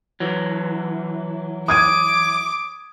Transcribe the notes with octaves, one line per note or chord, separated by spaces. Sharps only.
E3 F#3
D6 D#6 G#6 D#7